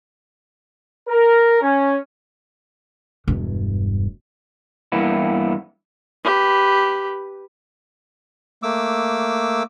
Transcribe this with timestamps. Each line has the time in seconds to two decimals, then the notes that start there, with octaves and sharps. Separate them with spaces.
1.08 A#4
1.62 C#4
3.28 E1 G2
4.92 G2 E3 A#3 B3 E4
6.24 G4 B4
8.63 A3 A#3 D6 E6